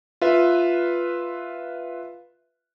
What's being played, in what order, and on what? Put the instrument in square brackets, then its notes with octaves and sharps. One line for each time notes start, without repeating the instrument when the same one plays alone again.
[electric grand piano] F4 B4 E5